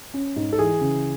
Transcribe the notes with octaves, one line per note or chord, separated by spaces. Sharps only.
C#4
G#2
A4
E3 G#4
C#3